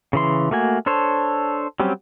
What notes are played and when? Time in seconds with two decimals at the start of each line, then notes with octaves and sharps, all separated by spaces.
0.13 C#3 E3 C6
0.51 A3 A#3 F#4 G#5
0.86 D4 A4 C5 C#5
1.80 F#3 G3 C4 C#4 G4